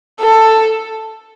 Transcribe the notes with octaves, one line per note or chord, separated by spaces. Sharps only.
A4